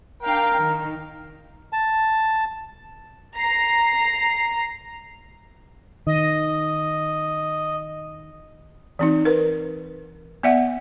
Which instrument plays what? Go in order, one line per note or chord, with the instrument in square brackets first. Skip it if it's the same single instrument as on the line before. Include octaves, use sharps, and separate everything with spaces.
[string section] D4 F5 G5 [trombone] A#4
[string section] D#3
[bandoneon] A5
[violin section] A#5 C7
[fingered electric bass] D#3 [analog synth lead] D#5
[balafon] E3 C4 D#4
A#4 B4
B3 D5 E5 F#5